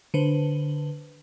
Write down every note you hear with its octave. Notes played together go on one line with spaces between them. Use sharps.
D3 B4 C5